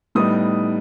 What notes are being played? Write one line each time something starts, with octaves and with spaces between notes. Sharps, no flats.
A2 G3 B3 D#4 D#6